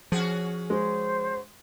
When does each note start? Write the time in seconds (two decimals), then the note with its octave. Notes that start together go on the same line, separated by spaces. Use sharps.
0.12 F3 C#4 F#4 G#4
0.70 G#3 C5